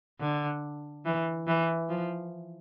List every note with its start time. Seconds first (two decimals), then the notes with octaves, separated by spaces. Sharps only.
0.20 D3
1.05 E3
1.48 E3
1.89 F3